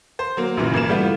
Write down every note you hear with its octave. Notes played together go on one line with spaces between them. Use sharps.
C5
F#3 A#3
A#1 F#2 A#2 C#3 E3
G#1 E3 A#3 E7
G3 A3 B3 E4 F4